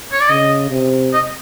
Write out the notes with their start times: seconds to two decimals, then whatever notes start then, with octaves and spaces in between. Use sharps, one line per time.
0.12 C#5
0.20 D5
0.30 C#3 D#5
0.71 C3
1.13 D#5